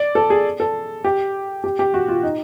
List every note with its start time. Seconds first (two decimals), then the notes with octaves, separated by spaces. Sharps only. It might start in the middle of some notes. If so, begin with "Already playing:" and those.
Already playing: D5
0.15 A4
0.30 G#4
0.60 A4
1.04 G4
1.64 G4
1.79 G4
1.94 F#4
2.08 F4
2.23 D#4